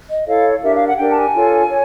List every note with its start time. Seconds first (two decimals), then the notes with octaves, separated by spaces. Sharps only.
0.09 D#5
0.27 E4 A4 C#5 F5
0.63 D4 G4 A#4 E5
0.75 F5
0.86 F#5
0.98 D4 G4 A#4 G5
1.10 A5
1.15 G#5
1.34 F4 A4 C#5
1.69 C#5